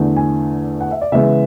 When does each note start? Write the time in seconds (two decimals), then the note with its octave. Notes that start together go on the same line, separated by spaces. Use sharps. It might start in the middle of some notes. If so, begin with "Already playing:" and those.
Already playing: E2 D3 A3
0.17 G#5
0.81 F#5
0.91 E5
1.01 D5
1.12 C#3 E3 G#3 B3 E5